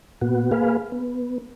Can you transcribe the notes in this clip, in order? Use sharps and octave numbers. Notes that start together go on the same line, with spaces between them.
A#2 B3 F#4
A#3 G#4 B4 F5
B3